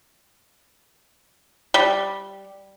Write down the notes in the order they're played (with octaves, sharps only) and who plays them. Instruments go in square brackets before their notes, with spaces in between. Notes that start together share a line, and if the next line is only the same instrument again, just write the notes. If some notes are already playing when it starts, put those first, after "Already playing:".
[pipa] G3